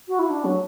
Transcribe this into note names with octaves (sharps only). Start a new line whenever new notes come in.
F#4
E4
D4
F#3